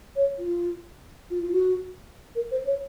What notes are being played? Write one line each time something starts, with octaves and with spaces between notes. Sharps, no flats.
C#5
F4
F4
F4
F#4
A#4
C5
C#5